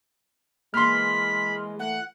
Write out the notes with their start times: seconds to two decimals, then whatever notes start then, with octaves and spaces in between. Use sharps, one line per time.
0.74 E3 G#3 A#3 B5 C6 F6
1.79 A3 F#5